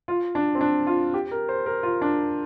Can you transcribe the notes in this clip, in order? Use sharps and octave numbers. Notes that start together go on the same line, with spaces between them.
F4
D4
C4
D4
F4
G4
A#4
C5
A#4
F4
D4